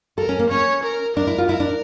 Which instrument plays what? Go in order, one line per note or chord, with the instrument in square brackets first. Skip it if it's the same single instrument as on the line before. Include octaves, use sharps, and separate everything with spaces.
[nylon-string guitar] A4 [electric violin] A#4
[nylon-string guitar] C#4
A#3
[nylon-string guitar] C#4 [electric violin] C#5
[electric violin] A#4
[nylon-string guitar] D4 [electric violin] A#4
[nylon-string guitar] E4
F4
[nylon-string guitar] E4 [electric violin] A#4
[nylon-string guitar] D4